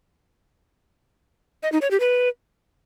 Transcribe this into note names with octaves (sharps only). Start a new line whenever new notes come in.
D#5
D#4
C#5
G4
B4